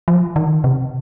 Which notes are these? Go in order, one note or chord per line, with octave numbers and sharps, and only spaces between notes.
F3
D#3
C3